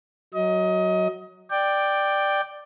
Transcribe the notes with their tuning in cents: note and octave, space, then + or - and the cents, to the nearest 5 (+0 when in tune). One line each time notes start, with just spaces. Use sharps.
F#3 +0 D#5 +25
D5 +10 G5 +0